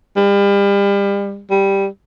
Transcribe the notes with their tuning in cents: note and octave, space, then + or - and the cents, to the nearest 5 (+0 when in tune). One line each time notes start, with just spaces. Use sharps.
G3 +35
G3 +0